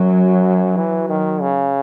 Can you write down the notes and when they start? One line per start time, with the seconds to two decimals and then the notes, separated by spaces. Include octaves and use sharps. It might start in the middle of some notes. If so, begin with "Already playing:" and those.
Already playing: F#2 F#3
0.77 E3
1.09 D#3
1.41 C#3